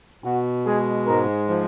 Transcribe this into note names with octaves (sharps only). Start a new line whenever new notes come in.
B2 F#4
G#3 G#4
G#2 A#4
F3